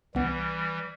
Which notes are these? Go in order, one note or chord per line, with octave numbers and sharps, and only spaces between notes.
C2 E3 G3 B3